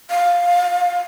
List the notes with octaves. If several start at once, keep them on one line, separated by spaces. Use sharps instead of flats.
F5